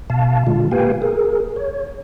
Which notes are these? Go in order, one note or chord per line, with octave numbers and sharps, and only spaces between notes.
B2 F5 A5
A#2 D3 G#3 F4
A#3 G4 B4 F5 G5 G#5
G#4 A#4
C#5